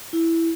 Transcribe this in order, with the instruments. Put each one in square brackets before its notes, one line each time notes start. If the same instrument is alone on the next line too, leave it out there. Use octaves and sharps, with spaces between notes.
[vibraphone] E4